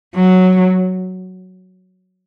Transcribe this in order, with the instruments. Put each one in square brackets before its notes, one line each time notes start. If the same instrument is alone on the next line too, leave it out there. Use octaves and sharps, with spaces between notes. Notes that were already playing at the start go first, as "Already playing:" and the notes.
[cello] F#3